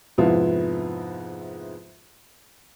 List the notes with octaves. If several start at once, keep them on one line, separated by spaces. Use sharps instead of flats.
F2 G#2 C3 B3 E4 F4